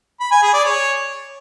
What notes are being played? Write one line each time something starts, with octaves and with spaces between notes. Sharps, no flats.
B5
G#5
G#4
D5
C#5